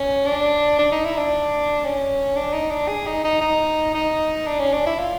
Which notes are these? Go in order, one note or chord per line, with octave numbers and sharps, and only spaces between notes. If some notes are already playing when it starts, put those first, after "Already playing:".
Already playing: C#4
D4
D4
D#4
E4
D4
C#4
D4
D#4
D4
G#4
D#4
D#4
D#4
D#4
D4
C#4
D4
E4
F4